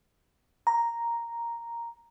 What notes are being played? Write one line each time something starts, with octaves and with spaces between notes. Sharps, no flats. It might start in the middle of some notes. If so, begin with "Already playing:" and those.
A#5